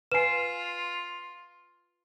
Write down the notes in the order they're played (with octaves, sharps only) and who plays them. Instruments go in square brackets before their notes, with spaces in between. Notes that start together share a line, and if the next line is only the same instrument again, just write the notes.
[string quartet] F4 [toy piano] B4 G#5 [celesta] C7 E7